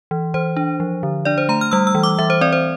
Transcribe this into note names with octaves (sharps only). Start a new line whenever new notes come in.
E3
E3 C5
D4
F3
D3
D4 D5
C5
A3 A#5
F6
G3 E6
E6
E3
D6
E3 E5
C5
C4 D5
C5